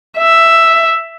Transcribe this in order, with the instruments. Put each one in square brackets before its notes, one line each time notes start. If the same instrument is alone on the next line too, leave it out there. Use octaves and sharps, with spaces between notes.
[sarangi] E5